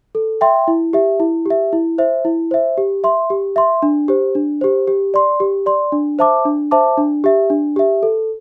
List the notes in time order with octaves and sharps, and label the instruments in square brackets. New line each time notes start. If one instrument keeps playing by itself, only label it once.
[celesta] A4
E5 G5 C6
E4
G4 E5
E4
G4 E5
E4
C5 E5
E4
C5 E5
G4
E5 C6
G4
E5 C6
D4
G4 C5
D4
G4 C5
G4
D5 C6
G4
D5 C6
D4
C5 E5 A5 D6
D4
C5 E5 A5 D6
D4
G4 E5
D4
G4 E5
A4